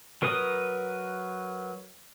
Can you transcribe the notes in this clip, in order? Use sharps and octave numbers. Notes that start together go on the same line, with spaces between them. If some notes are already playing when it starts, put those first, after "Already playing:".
F#3 A#4 B4 D#6